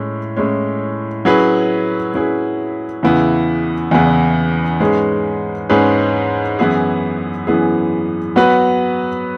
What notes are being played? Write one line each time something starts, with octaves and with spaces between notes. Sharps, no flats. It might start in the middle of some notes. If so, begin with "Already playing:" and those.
Already playing: A2 G#3 C#4
A2 G#3 C#4
F#3 C#4 E4 G#4 B4
F#3 C#4 E4 G#4 B4
E2 C#3 E3 B3 E4
E2 C#3 E3 B3 E4
G#2 G#3 C#4 G#4 B4
G#2 G#3 C#4 G#4 B4
F#2 E3 B3 E4 G#4
F#2 E3 B3 E4 G#4
F#3 B3 F#4 B4